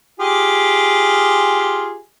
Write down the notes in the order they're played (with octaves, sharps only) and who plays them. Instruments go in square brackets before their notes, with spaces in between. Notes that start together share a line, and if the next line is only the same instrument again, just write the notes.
[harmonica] F4 G4 G#4